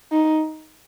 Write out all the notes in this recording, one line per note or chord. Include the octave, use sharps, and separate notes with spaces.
D#4